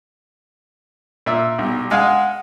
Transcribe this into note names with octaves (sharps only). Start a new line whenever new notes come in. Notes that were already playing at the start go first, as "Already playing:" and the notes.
A#2 E5
B1 G3
G#3 F5 F#5 G#5